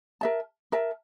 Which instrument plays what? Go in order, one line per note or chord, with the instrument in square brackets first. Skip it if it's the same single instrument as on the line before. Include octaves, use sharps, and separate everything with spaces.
[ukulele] A#4 E5 A5
A#4 E5 A5